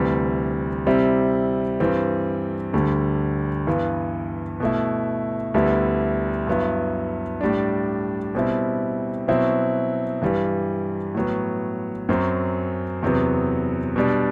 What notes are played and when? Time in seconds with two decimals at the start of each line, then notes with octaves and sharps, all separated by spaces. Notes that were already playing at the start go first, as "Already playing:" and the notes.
Already playing: D2 C3 E3 G3
0.86 C3 G3 C4 E4
1.80 G2 E3 G3 C4
2.73 D2 D3 G3
3.67 G2 E3 B3
4.60 B2 A3 E4
5.54 D2 D3 G3 B3 E4
6.47 G2 F#3 B3 E4
7.41 A2 G3 D4
8.35 B2 G3 C4 E4
9.28 B2 F#3 C4 E4
10.21 G2 E3 G3
11.15 A2 F#3 B3
12.09 F#2 F#3 C4
13.03 E2 C3 F#3 B3
13.96 B2 G3 D4